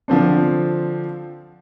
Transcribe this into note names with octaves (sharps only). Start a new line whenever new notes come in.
D3 F3 C4 D4